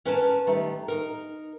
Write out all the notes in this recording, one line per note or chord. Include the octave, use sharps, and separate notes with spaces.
C#4 A#4 B4 C#5 G5 A5
D#3 G3 A3
D#4 A#4